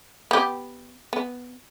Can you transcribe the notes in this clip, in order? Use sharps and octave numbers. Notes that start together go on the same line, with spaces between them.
B3 G4
B3